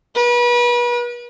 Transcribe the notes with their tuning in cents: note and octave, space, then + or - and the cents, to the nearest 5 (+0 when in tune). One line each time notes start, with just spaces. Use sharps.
B4 -35